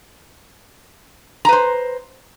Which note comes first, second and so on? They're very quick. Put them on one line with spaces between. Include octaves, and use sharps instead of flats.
A#5 B4 C5